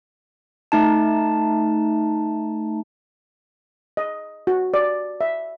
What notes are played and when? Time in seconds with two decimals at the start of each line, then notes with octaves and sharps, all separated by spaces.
0.72 A3 D#4 A5
3.97 D#5
4.47 F#4
4.74 D5
5.21 E5